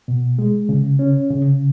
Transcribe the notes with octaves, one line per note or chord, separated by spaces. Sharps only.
B2
G#3
C#3
C#4
C#3